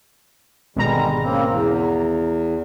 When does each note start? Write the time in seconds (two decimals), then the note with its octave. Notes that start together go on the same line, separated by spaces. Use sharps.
0.76 G#1 B2 D3 G3 G#3 A#5
1.23 C#3 A#3 C4
1.45 E2